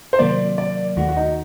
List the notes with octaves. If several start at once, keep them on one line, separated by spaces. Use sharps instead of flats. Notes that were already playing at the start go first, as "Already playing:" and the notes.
C5
C3 D#3 F#3 A#3 D5
D5
D#2 D#3 A3 F#4
F#4
D#4